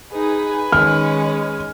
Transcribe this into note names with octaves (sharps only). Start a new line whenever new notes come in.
D#4 G#4 B4 G#5
D#3 G#3 C#4 F6